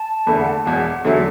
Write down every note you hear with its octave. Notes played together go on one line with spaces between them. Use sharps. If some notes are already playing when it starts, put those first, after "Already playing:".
Already playing: A5
E2 D3 A3 B5
F#5
A5
E1 E2 B2 F#5
E2 D3 F#3 A3 E5